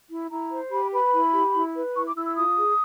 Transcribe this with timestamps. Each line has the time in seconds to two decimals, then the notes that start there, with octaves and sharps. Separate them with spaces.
0.10 E4
0.30 E4 A#5
0.50 C5
0.71 G4 B5
0.92 B4 B5
1.13 E4
1.33 G4
1.54 E4
1.75 B4
1.95 E4 C#6
2.05 D6
2.15 E4 E6
2.26 E6
2.36 F4 D#6
2.57 G#4